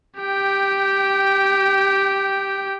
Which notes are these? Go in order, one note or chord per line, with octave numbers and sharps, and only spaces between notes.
G4 G5